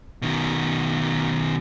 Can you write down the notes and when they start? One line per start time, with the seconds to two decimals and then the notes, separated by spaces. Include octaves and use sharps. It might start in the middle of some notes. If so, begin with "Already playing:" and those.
0.22 B2 D#3